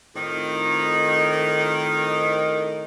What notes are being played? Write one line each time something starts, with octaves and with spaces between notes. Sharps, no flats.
F2 A2 D#3